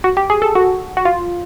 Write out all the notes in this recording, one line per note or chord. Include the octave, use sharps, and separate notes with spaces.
F#4
G4
G#4
A4
F#4
F#4
F4